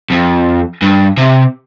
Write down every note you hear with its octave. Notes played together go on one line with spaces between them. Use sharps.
F2
G2
C3